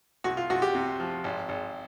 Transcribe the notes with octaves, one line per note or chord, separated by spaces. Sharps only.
C2 F#4
F4
C2 F#4
G4
C3
F3
G#1
G#1